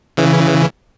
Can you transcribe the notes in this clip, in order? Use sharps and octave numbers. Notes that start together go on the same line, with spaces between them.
C#3 E3